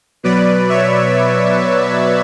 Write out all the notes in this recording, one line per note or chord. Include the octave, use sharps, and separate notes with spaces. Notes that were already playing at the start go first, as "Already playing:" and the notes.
B2 F#3 B4 D5
C#5 E5